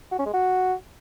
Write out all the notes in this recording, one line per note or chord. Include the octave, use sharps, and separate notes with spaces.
F#4
C#4
G#3
F#4